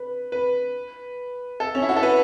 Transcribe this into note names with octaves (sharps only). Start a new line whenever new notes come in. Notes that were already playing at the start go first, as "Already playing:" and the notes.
Already playing: B4
B4
A4
C#4
E4
F#4
A4
B4